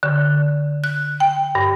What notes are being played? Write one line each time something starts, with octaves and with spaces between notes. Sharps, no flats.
D3
F#6
G5
G2